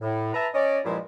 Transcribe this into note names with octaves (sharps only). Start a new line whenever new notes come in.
A2
B4 E5 A5 A#5
C#4 D5 D#5
G2 A#2 F3 G#3 E4